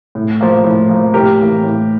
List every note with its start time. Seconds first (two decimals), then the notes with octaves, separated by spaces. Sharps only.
0.15 A2
0.41 F3 A#3
0.64 A2
0.89 F3 A#3
1.14 A2 G4 A#4
1.38 E3 A#3
1.63 A2